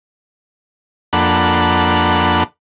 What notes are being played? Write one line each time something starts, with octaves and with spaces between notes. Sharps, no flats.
F2 A#3 D4 A4 F#5 B5